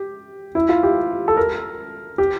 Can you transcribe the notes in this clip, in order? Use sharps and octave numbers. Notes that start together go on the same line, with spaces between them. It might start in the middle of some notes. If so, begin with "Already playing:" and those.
Already playing: G4
E4
F4
G4
A4
A#4
G4